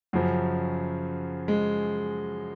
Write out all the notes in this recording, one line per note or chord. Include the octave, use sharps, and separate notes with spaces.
F#2 C#3 F3 F#3
G#3